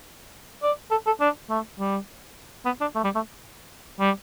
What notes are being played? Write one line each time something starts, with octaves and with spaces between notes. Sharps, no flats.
D5
A4
A4
D4
A3
G3
B3
D4
A3
G3
A3
G3